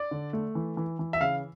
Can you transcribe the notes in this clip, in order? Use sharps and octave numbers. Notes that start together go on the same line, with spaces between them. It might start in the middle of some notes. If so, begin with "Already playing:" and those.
Already playing: D5
D3
A3
E3
E3
E3
E5
C#3 F5